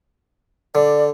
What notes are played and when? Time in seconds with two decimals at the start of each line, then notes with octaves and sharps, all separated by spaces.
0.75 D3 D5